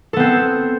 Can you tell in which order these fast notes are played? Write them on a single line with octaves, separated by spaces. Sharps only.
A4 B3 C4